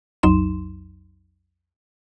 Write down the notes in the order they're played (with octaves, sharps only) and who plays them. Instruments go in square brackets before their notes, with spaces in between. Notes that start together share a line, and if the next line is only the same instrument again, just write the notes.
[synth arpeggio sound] B1 F2 F#3 D#4 C6 E7